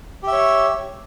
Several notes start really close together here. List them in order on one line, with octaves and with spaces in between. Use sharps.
G4 E5 C#5